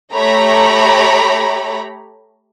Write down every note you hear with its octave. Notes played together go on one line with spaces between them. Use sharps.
A3 G4 C#5 A#5 B5